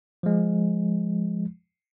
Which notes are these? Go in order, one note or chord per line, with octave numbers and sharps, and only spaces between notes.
F3 G#3